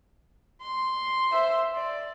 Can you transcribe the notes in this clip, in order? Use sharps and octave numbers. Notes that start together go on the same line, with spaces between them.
C6
C5 E5
D5